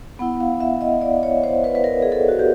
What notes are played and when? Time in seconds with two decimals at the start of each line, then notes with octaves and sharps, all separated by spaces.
0.19 B3 E4 F#5
0.40 F5
0.60 E5
0.81 D#5
1.01 D5
1.23 C#5
1.44 C5
1.64 B4
1.75 B4
1.84 A#4
2.02 G#4
2.12 A4
2.29 F#4
2.39 G4